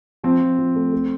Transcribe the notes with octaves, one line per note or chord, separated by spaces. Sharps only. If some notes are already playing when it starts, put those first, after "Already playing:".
F3 C4
F3
F3
A3
A3